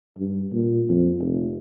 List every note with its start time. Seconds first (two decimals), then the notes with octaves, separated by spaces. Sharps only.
0.18 G2
0.53 A#2
0.89 F2
1.20 F1